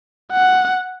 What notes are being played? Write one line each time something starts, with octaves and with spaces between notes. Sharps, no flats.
F#5